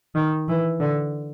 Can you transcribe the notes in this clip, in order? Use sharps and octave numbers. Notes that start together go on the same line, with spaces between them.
D#3
E3
D3